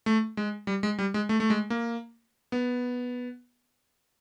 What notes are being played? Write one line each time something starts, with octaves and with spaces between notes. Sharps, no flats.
A3
G#3
G3
G#3
G3
G#3
A3
A3
G#3
A#3
B3